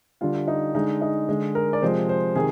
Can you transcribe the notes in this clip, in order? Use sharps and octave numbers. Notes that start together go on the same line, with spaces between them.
D3 G3 F4
D#4
D3 G#3 D#4
D#4
D3 G#3
A#4
D5
C3 F3 G#3 C5
C5
C3 D#3 G#4